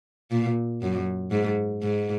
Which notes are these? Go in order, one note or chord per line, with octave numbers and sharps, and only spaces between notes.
A#2
F#2
G#2
G#2